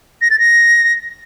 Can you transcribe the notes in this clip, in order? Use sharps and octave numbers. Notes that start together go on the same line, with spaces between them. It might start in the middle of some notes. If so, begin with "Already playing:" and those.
A#6
A6
A#6